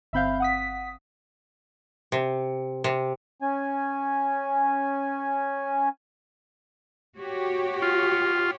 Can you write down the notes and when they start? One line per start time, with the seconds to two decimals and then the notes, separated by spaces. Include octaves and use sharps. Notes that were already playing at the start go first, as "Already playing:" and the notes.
0.13 G1 C4 E5 F5 B5 G6
0.40 F#5 D#6 B6
2.12 C3
2.84 C3
3.42 C#4 G#5
7.18 F#4 G4 C#5
7.82 F4